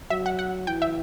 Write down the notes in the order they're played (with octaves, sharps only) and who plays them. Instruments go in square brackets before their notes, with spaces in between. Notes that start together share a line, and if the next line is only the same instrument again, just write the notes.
[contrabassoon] F#3 [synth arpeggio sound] E5
[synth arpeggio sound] F#5
F#5
[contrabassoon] E3 [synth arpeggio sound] G5
[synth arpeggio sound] E5